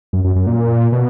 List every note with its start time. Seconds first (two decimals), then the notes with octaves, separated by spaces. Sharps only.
0.13 F#2
0.24 F#2
0.36 F#2
0.47 A#2
0.92 B2